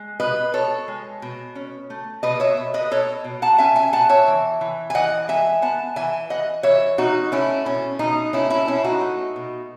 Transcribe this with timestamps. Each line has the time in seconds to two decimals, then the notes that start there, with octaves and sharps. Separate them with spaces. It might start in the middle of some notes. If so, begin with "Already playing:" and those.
Already playing: G#3
0.20 B2 B4 D#5
0.54 B2 A4 C#5
0.88 G#3
1.22 B2
1.55 C#4
1.90 A3
2.23 B2 B4 D#5
2.40 C#5 E5
2.57 B2
2.74 B4 D#5
2.91 B2 A4 C#5
3.24 B2
3.42 F#5 A5
3.58 C#4 E5 G#5
3.76 E5 G#5
3.93 B2 F#5 A5
4.09 C#5 E5
4.27 E3
4.61 E3
4.90 G#5
4.94 E3 D#5 F#5
5.28 G#3 E5 G#5
5.62 B3 F#5 A5
5.96 E3 E5 G#5
6.30 E3 D#5 F#5
6.63 E3 C#5 E5
6.98 B2 D#4 F#4
7.32 A3 C#4 E4
7.65 B2 C#4
7.99 B2 D#4
8.33 A3 C#4 E4
8.50 C#4 E4
8.68 B2 C#4 E4
8.84 D#4 F#4
9.01 A3
9.36 B2